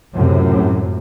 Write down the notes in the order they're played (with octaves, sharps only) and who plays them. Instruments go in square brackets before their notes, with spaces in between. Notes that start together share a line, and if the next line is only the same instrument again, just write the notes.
[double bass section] C#2 F#2 A2 C3